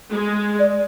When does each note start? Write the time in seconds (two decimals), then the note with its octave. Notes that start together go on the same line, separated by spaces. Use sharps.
0.11 G#3
0.59 D5